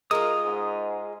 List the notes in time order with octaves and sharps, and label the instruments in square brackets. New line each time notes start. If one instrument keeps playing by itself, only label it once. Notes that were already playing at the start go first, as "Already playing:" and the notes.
[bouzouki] G#3 F4 [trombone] A#4 [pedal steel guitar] D#6
[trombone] G#2